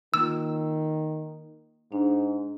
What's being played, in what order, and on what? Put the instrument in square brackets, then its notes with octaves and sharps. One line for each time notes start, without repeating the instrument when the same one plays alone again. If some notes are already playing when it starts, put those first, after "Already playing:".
[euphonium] D#3 [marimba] A#3 F4 [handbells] E6
[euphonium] G#2 [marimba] D4